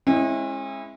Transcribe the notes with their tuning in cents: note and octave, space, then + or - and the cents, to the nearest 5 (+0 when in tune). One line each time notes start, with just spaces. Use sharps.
G#3 +0 C#4 -40 E4 +5